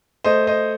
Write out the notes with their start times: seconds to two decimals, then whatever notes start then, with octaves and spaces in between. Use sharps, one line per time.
0.24 A3 C5 D#5
0.47 C5 D#5